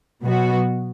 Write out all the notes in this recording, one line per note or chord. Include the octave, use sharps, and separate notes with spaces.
B2 F#3 B3 F#4